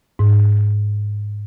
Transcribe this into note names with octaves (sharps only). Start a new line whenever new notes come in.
G#2